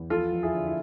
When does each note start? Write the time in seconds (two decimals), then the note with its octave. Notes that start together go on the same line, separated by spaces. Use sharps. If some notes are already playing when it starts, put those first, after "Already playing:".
Already playing: E2
0.10 F3 F4 A4
0.32 F2
0.43 E4 G#4
0.54 D3
0.67 E4